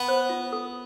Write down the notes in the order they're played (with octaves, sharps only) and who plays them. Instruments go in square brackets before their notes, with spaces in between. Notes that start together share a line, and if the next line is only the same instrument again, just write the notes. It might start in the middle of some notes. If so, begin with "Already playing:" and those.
Already playing: [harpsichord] B3 B4
[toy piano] C5
F4
A4